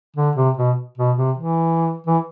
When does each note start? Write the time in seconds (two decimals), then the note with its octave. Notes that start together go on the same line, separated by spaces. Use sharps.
0.16 D3
0.36 C3
0.57 B2
0.98 B2
1.17 C3
1.37 E3
2.07 E3